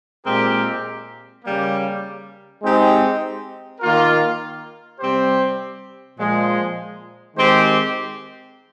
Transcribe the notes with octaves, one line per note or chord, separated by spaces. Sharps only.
A#2 G#3 C4 G4 A#4
C#3 G3 A#3
G#3 C4 D#4 G4
D#3 A#3 F4 A#4
C3 G3 C4 G4 C5
A#2 F3 G#3
D#3 G#3 C4 G4 C5